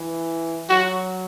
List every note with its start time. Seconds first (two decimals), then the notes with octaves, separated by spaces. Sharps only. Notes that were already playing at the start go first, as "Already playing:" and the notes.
Already playing: E3
0.69 F#3 F#4